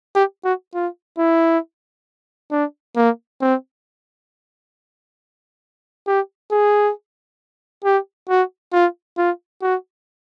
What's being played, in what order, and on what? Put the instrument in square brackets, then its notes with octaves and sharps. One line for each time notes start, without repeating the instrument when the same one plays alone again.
[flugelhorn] G4
F#4
F4
E4
D4
A#3
C4
G4
G#4
G4
F#4
F4
F4
F#4